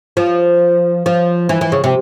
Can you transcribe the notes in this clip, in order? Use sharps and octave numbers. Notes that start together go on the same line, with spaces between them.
F3
F3
E3
E3
C#3
C3